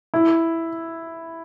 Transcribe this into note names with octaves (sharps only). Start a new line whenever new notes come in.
E4